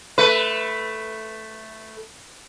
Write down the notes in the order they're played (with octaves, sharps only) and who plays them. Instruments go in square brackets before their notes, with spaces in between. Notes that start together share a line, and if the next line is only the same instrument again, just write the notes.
[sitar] A3 B4